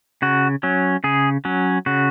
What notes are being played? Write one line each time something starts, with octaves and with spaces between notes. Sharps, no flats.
C#3 F#4
F#3 C#4
C#3 G#4
F#3 C#4
C#3 F#4